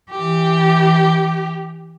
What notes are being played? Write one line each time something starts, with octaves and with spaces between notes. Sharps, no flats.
E3 G4